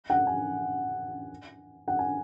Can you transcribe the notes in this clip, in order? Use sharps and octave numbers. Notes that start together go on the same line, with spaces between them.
F#5
G#5
F#5
G#5